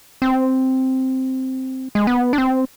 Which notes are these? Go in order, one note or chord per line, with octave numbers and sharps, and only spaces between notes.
C4
G#3
B3
D4
C4